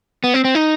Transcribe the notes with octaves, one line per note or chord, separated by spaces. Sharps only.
B3
C4
C4
D#4